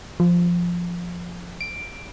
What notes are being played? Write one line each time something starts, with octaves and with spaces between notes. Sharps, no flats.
F3
D7